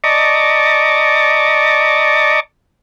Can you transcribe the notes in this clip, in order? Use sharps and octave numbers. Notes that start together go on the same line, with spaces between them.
D5 D#5 A5 A#5 C#6 D6